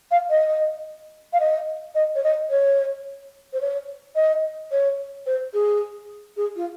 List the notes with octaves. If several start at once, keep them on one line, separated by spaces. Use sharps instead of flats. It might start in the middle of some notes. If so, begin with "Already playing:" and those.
F5
D#5
F5
D#5
D#5
C#5
D#5
C#5
C5
C#5
D#5
C#5
C5
G#4
G#4
F4